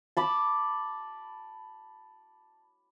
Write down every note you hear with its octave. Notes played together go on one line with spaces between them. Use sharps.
A5 B5 D6